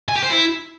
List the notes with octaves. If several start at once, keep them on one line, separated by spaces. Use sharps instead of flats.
G#5
G4
C5
E4